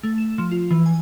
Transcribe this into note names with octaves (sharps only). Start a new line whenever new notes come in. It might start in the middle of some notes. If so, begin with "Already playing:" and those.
A3
E7
F3
F4
E3
G#5